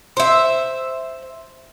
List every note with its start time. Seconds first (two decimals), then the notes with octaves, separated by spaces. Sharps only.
0.17 C5 E5